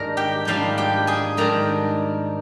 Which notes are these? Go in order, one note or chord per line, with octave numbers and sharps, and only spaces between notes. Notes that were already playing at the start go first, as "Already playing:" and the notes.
Already playing: G#2 D#3 G3 D4 A#4 A#5
G4 G5
G#2 D#3 G3 D4 F4 F5
G4 G5
G#4 G#5
G#2 D#3 G3 D4 A#4 A#5